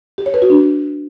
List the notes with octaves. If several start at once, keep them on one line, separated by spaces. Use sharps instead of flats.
G4
C#5
B4
F#4
D4